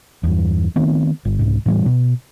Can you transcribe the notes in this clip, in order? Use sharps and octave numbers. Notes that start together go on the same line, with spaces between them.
E2 G2
D#3 A3 B3 C4
G1
C2 G#2
A2 E3 F#3 G3
B2